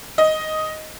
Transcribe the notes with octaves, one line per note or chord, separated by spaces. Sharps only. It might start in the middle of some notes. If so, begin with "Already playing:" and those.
D#5